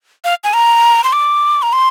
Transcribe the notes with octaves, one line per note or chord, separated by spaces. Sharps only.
F5
G#5
A#5
C6
D6
A#5
C6